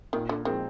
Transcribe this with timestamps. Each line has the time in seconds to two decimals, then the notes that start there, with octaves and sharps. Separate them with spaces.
0.13 A#2 D#3
0.29 D3
0.45 D#3 F3 G#3 C4